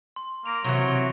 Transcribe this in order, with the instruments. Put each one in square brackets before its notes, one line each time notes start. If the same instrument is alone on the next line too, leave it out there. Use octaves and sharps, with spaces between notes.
[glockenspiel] C6
[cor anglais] A#3 [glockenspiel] A#6 D7 F7
[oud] C3 E3 [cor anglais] F#3 [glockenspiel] C#6 G#6 D7
[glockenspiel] C#7 D7 G7